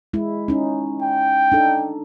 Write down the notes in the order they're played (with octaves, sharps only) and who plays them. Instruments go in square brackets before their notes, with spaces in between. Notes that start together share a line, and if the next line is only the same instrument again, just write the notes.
[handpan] G#3 E4
C#4 D#4
[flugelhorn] G5
[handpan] D4 D#4 A4